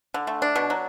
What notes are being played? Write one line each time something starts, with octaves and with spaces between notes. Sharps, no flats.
D3
A3
D4
B2
F#3